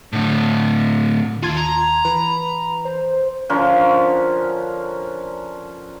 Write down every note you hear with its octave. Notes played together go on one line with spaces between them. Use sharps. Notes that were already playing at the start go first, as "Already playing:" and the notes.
A2 D3
D#2 E4 F4 A5 C6 G#6
A#5
E3 B4 B5
C5
D3 F3 C#4 A#4